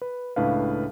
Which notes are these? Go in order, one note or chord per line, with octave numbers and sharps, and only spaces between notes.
B4
C#2 A2 D4 B4 F5